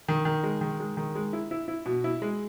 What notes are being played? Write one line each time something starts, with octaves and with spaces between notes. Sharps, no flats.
D#3
D#3
G#3
D#3
G#3
D#3
G#3
E4
E4
E4
B2
E4
G#3